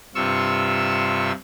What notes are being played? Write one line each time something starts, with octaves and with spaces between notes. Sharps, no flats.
G2 C3 F4 C#6 E6